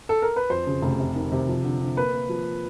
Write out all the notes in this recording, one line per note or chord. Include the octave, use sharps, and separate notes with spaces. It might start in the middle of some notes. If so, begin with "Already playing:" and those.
A4
A#4
B4
F2 C5
C#3
F1
C3
D#3
C3
F3
D3
D3
A#3 B4
A#3
F3